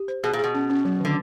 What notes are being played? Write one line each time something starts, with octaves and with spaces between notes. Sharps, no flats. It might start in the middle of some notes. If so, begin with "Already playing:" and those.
Already playing: G4
C5
B2 G#4
A#2
B2 G#4
C#4
C#4
F#3
D3 D#3